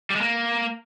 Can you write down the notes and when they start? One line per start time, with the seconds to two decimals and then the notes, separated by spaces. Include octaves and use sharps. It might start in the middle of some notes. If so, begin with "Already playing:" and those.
0.10 G3
0.16 G#3
0.21 A#3